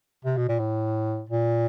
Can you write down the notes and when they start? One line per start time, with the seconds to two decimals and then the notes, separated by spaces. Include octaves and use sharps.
0.25 C3
0.37 B2
0.49 A#2
0.59 A2
1.29 A#2